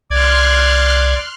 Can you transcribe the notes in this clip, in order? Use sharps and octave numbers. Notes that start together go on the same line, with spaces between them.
C2 D5 C6 F6 F#6 G#6